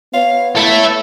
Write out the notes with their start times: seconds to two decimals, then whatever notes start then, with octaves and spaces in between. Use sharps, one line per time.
0.14 B3 C#5 F5
0.56 E4 A4 E5